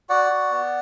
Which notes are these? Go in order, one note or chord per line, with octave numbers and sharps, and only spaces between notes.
F#4 D5 F#5
F#4
B3